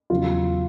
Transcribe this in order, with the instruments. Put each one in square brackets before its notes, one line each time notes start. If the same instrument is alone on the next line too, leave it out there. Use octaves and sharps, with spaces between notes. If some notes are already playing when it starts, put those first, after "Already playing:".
[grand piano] E2 C#3 F#3 F4